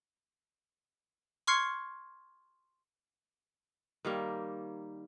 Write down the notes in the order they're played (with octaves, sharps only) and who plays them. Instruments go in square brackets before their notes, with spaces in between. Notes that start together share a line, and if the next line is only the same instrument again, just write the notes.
[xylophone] C6 C#6 F6 G#6 C7 C#7
[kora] D#3 G3 A#3